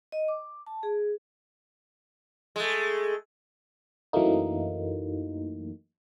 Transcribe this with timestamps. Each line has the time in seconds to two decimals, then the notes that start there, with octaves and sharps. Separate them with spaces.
0.12 D#5
0.28 D6
0.67 A5
0.83 G#4
2.56 G#3 A3
4.13 F#2 E3 F#3 A3 A#3 D#4